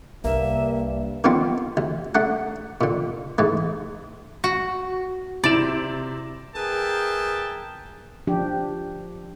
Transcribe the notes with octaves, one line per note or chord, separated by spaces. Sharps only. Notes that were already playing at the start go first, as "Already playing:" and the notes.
C2 G2 A#3 E5
D3 D#3 F3 B3 C4
D2
A3 D4 F#5
A#2 D3
G#2 E3 A3
F#4
C3 E4 D5 E7
G#4 A#4 B4 E5 G5 A5
F3 D4 G4